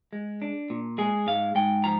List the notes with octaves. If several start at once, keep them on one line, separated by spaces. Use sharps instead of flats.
G#3
D4
A#2
G#3 G#4
G#2 F5
G#2 G5
F3 A#5